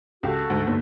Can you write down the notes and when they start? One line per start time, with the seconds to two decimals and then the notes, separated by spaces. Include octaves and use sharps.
0.23 C#2 F#4 G4 A4
0.50 D2 G#2 G#3
0.67 G1 A#3 D4 D#4